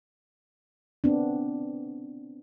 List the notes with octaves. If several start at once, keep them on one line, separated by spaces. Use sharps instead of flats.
B3 C4 D4